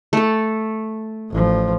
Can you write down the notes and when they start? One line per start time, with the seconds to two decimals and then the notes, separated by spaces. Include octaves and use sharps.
0.13 A3 A4
1.31 A1 F3